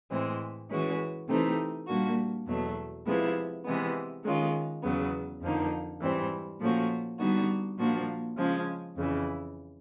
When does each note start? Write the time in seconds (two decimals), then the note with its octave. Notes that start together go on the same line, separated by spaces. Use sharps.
0.10 A2 E3 G#3 C4
0.70 E3 G#3 C#4 F#4
1.28 C3 E3 A3 C4 D#4
1.87 A#2 G3 A#3 D4 F#4
2.46 E2 B2 F#3 A3
3.06 C3 F3 G#3 B3 E4
3.64 C3 E3 G#3 B3
4.24 D#3 G#3 C#4 F4
4.82 E2 C#3 F#3 B3
5.41 F2 D3 F3 A#3 D#4
6.00 G#2 E3 G3 C4
6.59 A#2 F3 A3 C#4 F#4
7.19 D3 G3 B3 D#4 F#4
7.78 A#2 F3 A#3 D4 F#4
8.37 C#3 F3 G#3
8.96 F2 C#3 E3